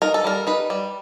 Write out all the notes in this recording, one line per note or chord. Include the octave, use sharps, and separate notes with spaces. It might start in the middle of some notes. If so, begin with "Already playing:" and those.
D#4 A#4
A4
G3 A#4
D#4 B4
G3